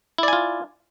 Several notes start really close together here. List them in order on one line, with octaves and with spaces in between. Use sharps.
E4 D5 G#5 F4